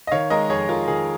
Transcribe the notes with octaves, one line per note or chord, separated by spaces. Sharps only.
D#5
D#3 C#5 F5
G#3 A#4 D#5
F2 G#4 C#5
F2 F4 A#4
D#3 G#4